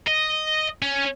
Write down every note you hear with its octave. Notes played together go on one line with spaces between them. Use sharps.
D#5
C#4